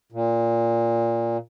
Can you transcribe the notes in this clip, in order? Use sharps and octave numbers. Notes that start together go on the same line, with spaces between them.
A#2